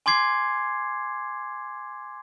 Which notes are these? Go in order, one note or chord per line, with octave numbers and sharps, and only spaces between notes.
G#5 C6 D6 G#6 C7